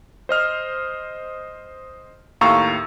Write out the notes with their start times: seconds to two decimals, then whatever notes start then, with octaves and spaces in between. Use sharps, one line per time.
0.29 C5 D#5 F6
2.41 D#2 A2 F5 A#5 C#6 E6